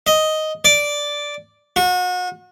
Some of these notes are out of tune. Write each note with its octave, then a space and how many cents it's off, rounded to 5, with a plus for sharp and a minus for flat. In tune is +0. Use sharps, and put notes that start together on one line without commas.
D#5 +5
D5 -5
F#4 -35